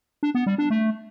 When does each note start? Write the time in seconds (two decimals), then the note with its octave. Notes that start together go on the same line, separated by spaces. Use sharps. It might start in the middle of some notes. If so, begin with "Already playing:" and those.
0.23 D4
0.35 B3
0.46 G3
0.58 D4
0.70 A3